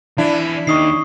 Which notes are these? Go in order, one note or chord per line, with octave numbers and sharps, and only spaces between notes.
E3 D4 E4 D5
D#2 D#4 C#6 D#6 C7